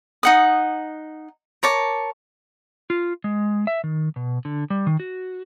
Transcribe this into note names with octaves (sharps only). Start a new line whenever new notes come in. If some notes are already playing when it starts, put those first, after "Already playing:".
D#4 F#5 D#6
A#4 C#5 A5 D6
F4
G#3
E5
D#3
B2
D3
G3
D#3
F#4